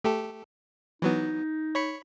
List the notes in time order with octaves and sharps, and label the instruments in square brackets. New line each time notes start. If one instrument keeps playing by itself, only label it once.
[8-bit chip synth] A3 G4 A4
[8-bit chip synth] E3 F#3 B3 [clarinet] D#4
[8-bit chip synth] C#5 B5 C#7